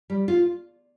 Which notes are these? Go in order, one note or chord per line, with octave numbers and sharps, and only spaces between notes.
G3
F4